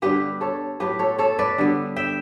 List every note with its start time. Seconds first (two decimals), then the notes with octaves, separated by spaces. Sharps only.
0.02 D3 G3 B3 G4 B4
0.41 A4 C#5
0.80 A2 F#3 B3 G4 B4
0.99 A4 C#5
1.18 A4 C#5
1.39 B4 D5
1.58 D3 G3 B3
1.96 E5 G5